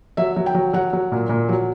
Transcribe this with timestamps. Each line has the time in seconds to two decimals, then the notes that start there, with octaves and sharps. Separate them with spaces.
0.17 F#3 E5
0.36 F#3
0.46 G5
0.54 F#3
0.73 F#3 F#5
0.93 F#3
1.12 A#2
1.29 A#2
1.49 F#3